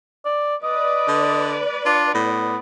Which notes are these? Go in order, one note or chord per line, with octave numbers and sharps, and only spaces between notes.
D5
B4 D5 D#5
D3
D4 F4
A2 B3